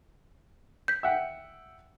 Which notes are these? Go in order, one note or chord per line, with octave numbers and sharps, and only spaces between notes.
G6 B6
E5 F#5 G5